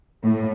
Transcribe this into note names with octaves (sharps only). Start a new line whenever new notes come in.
A2